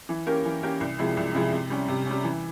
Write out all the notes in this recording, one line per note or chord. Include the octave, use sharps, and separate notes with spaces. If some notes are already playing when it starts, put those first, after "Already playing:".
E3
A#3 C#4 G4 A#4
E3
A#3 C#4 G4 A#4
C2
C3 F3 G#3 E4
C2
C3 F3 G#3 E4
C3
G3 C#4
C3
G3 C#4
E3